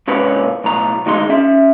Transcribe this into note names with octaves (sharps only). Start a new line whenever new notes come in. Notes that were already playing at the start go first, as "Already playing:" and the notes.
G#2 C3 A#3 C#4 B4
B1 A2 A#5
D2 D#3 G#3 D#4 C6
C#4 E5